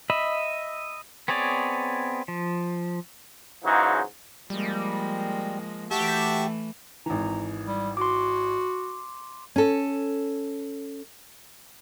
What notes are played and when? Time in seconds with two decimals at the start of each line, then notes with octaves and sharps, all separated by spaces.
0.10 D#5 E5 B5
1.28 B3 C4 G#4 C#5 D5
2.28 F3
3.64 G#2 C#3 E3 F#3 D#4
4.50 F3 G3 G#3 A#3
5.91 E3 A3 F#4 G4 E5 A5
7.06 G#1 E3 A#5
7.67 G3
7.97 F#4 C6 D6
9.56 C#4 A4